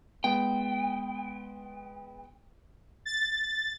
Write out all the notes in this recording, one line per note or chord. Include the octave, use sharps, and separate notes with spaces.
G#3 B3 G5
A6